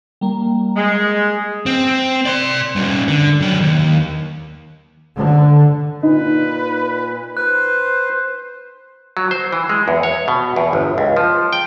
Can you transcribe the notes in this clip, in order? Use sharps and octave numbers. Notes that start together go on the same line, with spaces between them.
G3 A#3
G#3
C4
D5 C6
G3 C#4
D3
F#3 D5
D#2
D3
A#2 D#4 B4
B4 C5 F#6
F#3
C5
E3
G#3
E2
C#5
B2
E2
G1
C#2
F3
G5